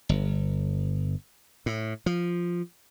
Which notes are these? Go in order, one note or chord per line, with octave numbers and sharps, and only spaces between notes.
G1
A2
F3